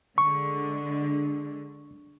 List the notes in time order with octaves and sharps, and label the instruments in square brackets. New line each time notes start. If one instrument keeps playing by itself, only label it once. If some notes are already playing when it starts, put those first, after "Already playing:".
[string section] D3 G#3 [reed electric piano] C#6